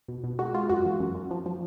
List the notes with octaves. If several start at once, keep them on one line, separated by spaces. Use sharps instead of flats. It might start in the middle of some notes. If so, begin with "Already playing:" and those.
B2
B2
G#3 F#4
G#3 F4
F#2 F#4
E3
F#2
F#2
F3
F3